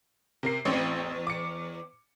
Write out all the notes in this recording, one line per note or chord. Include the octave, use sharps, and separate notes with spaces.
C3 A#4 C7
A1 E2 C4 C#5
D6 C#7